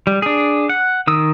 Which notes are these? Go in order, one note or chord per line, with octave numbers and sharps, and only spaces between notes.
G3
D4 G#4
F#5
D#3 D#6 E6